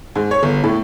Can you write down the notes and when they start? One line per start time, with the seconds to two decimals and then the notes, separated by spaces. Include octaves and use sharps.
0.16 G#2
0.31 C#5
0.43 G1
0.64 A2